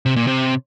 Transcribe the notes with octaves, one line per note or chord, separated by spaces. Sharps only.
C3
A#2
C3